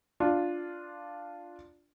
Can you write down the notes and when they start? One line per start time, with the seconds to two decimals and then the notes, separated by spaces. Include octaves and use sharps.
0.20 D4 F4